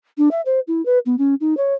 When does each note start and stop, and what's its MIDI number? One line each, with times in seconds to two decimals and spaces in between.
0.18 0.29 62
0.31 0.41 76
0.46 0.60 72
0.67 0.84 64
0.86 0.99 71
1.06 1.16 59
1.18 1.35 61
1.41 1.57 63
1.57 1.74 73